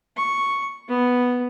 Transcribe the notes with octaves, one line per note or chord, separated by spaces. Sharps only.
C#6
B3